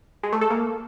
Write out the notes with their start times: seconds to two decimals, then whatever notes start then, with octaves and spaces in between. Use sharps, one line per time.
0.23 G#3
0.32 A3
0.41 A4
0.50 A#3